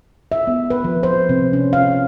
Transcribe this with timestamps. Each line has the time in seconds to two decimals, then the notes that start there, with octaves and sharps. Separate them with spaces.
0.32 E5
0.47 B3
0.70 B4
0.84 F3
1.03 C5
1.29 C3
1.53 C#4
1.73 F5